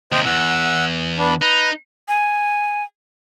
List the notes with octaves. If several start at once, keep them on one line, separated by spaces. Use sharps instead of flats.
D#2 C3 C5 D#5 G5
E2 F#5 E6
B3 D4
D#4 B4
G#5